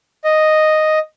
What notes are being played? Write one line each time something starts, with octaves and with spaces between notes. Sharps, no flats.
D#5